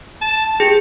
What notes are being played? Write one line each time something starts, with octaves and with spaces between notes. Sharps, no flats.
A5
G4 G#4